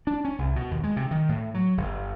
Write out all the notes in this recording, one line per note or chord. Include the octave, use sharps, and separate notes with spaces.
D4
C#4
C2
B2
D#2
G#3
C3
D#3
A2
F#3
G1